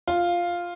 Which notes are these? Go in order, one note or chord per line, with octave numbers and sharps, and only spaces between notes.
F4